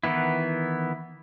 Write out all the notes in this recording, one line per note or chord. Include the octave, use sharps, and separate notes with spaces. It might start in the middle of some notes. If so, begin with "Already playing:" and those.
D#3 E3 B3 E4